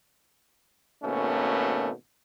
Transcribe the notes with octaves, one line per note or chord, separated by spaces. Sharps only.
G#1 B2 A3 A#3 C#4